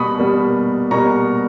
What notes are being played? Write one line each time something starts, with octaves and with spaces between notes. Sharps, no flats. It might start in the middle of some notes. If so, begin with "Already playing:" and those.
Already playing: B2 G3 A#3 B5 C#6 D#6
B2 G3 A#3
B2 G3 A#3 A#5 C#6